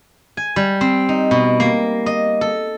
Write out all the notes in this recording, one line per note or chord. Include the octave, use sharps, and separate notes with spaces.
G#5
G3
C4
D#4
B2
A#3
D#5
A4